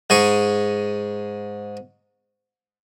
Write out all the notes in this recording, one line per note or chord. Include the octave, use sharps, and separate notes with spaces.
G#2 G#4 C#6